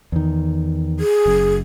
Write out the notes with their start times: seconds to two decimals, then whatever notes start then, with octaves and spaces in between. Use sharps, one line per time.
0.12 E2 D#3
1.00 G#4
1.26 F#1 F#2